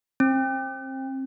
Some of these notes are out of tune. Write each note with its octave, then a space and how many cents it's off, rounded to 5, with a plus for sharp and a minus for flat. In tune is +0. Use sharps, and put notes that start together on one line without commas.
C4 +25